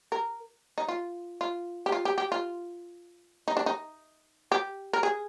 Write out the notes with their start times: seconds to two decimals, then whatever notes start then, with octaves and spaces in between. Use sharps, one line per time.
0.12 A#4
0.78 D#4
0.88 F4
1.41 F4
1.86 G4
1.92 F4
2.05 G4
2.18 G4
2.32 F4
3.48 D#4
3.57 D4
3.66 D#4
4.52 G4
4.93 A#4
5.03 G#4